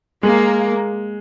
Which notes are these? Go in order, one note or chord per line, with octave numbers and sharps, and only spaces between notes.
G#3 A#3